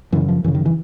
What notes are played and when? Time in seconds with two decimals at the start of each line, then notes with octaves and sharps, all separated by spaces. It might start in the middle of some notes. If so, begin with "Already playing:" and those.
0.12 F#2 C#3 E3
0.28 F3
0.44 F#2 E3
0.48 C#3
0.55 D#3
0.66 E3